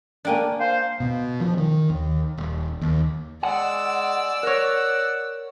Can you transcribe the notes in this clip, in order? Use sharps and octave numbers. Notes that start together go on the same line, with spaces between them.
A#3 D4 D5 G5 G#5
C5 F5
B2
F3
D#3
D#2
D#1
D#2
G#3 D5 F#5 E6
A#4 C#5 F#5